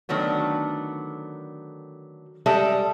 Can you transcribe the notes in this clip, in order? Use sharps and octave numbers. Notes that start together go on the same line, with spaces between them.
D3 D#3 F#3 A3 B3
G3 G#3 A4 E5